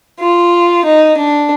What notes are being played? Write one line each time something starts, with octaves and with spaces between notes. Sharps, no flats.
F4
D#4
D4